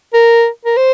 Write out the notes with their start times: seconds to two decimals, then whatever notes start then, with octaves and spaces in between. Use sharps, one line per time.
0.14 A#4
0.65 A#4
0.77 C5